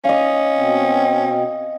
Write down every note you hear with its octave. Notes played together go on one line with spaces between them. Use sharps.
C#4 D#5 F5
B2 C4